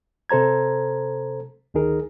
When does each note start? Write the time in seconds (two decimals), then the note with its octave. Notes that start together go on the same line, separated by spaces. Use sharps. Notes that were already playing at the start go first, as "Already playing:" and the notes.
0.29 C3 A4 C5 A#5 G#6
1.74 D2 D#3 D#4 G#4 A#4